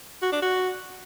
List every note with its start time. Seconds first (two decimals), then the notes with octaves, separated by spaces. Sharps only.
0.22 F#4
0.32 D4
0.42 F#4